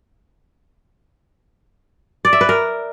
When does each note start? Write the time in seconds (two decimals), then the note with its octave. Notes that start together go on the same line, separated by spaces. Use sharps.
2.25 D5
2.33 E5
2.41 B4
2.49 A#4